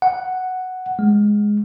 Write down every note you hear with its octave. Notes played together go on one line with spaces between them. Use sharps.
F#5
G#3